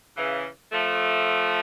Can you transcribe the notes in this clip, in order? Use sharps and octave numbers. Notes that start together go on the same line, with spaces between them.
C#3 E3
F3 A3